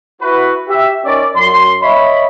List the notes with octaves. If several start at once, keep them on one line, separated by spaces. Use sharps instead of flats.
E4 F#4 B4
G4 E5
C#4 D#4 A#4 D5
F#2 C6
C#5 D#5 E5 B5